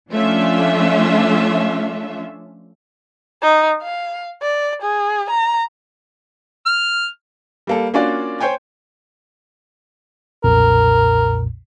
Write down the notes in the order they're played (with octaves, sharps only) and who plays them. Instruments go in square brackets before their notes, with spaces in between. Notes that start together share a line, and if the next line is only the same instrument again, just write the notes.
[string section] F3 A3 C#4 D4 F4 E5
[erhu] D#4
F5
D5
G#4
A#5
[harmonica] F6
[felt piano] G3 A#3 A4
A#3 C#4 D4 F4 F#4 D5
C5 C#5 G5 G#5
[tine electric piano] B1 F2 A#2 [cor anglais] A#4